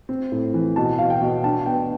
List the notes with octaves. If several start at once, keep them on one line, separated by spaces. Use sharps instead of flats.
C4
A2
E3
B2 A5
B2 F5
G5
B2
D4 A5
B3 G5